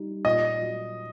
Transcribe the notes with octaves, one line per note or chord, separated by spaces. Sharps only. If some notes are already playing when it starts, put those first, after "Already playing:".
Already playing: G3 D#4
A#2 D#5
F#3